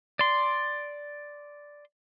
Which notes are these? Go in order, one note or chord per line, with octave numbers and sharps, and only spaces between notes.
D5 C6